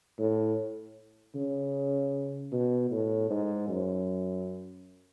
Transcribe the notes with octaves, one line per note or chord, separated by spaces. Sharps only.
A2
C#3
B2
A2
G#2
F#2